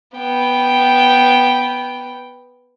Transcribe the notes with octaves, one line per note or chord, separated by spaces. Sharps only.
B3 G5